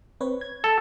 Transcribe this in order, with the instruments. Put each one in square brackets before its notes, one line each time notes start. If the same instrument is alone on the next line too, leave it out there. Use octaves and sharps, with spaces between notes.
[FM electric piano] C4 B4 C#5
G#6
[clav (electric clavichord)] A4